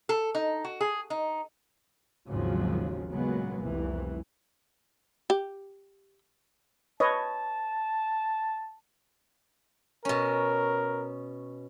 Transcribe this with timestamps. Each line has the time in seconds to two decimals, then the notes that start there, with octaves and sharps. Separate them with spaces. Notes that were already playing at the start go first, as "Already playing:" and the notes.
0.09 A4
0.35 D#4
0.64 F#4
0.81 G#4
1.10 D#4
2.28 G#1 D#2 G#2 C#3 F3 F#3
3.11 A#2 C#3 F#3 G#3 A#3 B3
3.60 F1 C2 E3
5.30 G4
7.00 B4 C#5 D#5 A5
10.05 B2 C#4 A#4